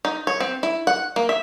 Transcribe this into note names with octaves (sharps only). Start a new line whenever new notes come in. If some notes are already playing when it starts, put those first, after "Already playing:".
D#4
C#5
C4
E4
F#5
A#3
E5